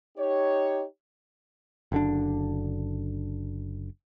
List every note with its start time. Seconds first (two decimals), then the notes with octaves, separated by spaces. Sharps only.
0.18 D#4 G4 C#5
1.92 F#1 D3 D4